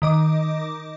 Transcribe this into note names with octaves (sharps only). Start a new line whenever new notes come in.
D#3 D#5 D6